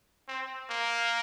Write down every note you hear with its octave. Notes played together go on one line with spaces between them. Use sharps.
C4
A#3